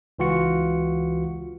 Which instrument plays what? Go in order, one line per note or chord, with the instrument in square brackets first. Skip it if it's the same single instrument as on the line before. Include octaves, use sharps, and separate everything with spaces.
[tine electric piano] C#2 E3 F4 F#4 C#7